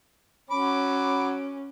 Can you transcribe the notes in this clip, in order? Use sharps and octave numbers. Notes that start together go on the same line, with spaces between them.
F#3 C#4 B5 D6